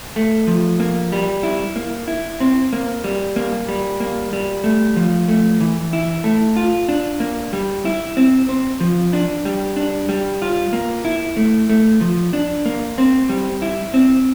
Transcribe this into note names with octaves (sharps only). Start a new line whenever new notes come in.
A3
F3
A#3
G3
E4
A#3
E4
C4
A#3
G3
A#3
G3
A#3
G3
A3
F3
A3
E3
E4
A3
F4
D4
A#3
G3
E4
C4
C4
F3
D4
G3
D4
G3
F4
A#3
E4
A3
A3
F3
D4
A#3
C4
G3
E4
C4